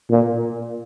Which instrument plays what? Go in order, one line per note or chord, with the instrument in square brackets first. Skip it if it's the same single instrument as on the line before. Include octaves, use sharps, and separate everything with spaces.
[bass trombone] A#2